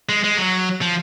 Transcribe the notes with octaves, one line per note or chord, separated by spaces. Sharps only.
G#3
G#3
F#3
F3